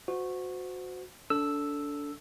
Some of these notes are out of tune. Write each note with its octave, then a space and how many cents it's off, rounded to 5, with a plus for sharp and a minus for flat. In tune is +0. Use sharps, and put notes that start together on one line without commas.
F#4 -15 C5 -30
D4 -25 A4 +5 E6 +0